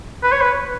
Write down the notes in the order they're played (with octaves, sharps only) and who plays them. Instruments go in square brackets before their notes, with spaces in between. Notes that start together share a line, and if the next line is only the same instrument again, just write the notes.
[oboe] B4
C#5
B4